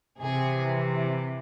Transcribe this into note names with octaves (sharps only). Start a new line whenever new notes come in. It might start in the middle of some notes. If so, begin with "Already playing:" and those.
C3 E3 G#4